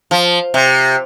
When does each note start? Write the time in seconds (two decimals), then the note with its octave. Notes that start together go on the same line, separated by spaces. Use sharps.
0.11 F3
0.54 C3